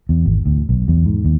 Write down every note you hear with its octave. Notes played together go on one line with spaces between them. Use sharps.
E2
G#1
D2
B1
E2
G#2
D#2